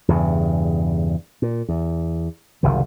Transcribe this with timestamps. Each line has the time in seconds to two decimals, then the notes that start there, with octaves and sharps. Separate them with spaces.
0.08 E2 G2 C#3
1.42 A#2
1.69 E2
2.63 F#1 C2 D#3